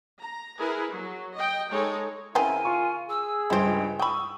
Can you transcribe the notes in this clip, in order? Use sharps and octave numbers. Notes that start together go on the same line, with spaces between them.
A#5
E4 G#4 A#4 B4
F#3
D#5 G5
G#3 D#4 G#4 A4 C#5
C#3 B3 C4 E4 A#4 G#5
F4 C#6
G#4 E6
C#2 G2 E4 C5 G5
G5 B5 C#6 D#6 E6